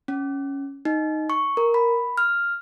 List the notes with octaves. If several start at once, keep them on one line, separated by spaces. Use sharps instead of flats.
C#4
D#4
C#6
A#4
B5
F6